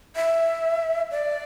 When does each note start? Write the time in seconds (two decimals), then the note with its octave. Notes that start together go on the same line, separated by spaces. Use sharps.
0.16 E5
1.11 D5